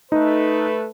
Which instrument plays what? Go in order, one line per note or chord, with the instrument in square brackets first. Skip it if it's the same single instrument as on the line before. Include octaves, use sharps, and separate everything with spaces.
[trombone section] A3 A4 B4 [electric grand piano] D#4